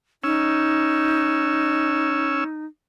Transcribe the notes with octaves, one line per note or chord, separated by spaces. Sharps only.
C#4 D#4 E6